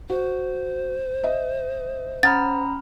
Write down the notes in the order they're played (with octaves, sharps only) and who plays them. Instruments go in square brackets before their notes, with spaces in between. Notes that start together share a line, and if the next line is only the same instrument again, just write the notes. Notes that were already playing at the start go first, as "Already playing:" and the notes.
[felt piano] F#4 [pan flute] C5
[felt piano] D#5 E5
[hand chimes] C#4 A#5 B5 [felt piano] F#5 F6 [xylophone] A6